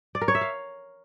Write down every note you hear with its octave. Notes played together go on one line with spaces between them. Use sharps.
D5
A#4
C#5
E5
F5